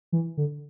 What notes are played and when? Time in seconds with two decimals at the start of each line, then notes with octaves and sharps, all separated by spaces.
0.12 E3
0.37 D3